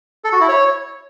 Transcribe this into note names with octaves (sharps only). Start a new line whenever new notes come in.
A4
F#4
E4
C#5